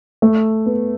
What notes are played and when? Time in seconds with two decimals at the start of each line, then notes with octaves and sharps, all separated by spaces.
0.22 A3
0.66 B3